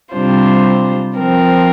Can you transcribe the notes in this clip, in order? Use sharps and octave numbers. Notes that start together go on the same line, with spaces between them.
C3 G3 D4 F4 C5
F3 C4 A#4